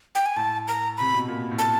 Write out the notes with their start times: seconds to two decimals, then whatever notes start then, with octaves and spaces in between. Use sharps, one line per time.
0.15 G5
0.26 G#5
0.36 A2 A5
0.68 A#5
0.98 C3 B5
1.14 B2
1.28 A#2
1.51 A2
1.59 A5